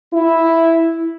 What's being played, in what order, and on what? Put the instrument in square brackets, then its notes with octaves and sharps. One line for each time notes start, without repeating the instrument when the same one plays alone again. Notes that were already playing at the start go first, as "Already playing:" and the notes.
[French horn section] E4